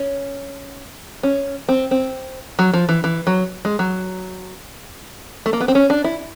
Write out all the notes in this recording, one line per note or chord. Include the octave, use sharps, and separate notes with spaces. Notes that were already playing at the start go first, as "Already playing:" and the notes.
Already playing: C#4
C#4
C4
C4
F#3
F3
E3
E3
F#3
G#3
F#3
A3
A#3
B3
C4
C#4
D4
E4